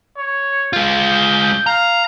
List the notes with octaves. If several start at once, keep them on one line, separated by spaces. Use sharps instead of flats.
C#5
G#3 F4 G6
F5 A#5